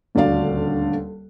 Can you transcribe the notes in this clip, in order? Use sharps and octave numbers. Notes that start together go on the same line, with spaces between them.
D#1 D2 F#4 D5 F5